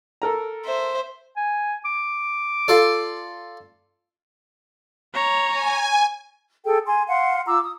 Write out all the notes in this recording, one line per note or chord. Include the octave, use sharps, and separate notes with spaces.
A4 A#4 A#5
C5 E5
G#5
D6
F4 A4 D5
C#5 A#5
G#5
G#4 A4 G5
G#5 C6
F5 F#5 C6
F4 A#5 D6 E6
D#6